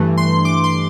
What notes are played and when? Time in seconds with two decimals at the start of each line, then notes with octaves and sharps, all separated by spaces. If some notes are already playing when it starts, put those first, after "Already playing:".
Already playing: G2 E3 A3
0.18 C6
0.45 D6
0.64 C6